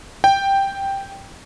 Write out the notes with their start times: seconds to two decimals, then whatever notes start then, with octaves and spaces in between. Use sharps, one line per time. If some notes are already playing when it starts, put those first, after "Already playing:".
0.24 G5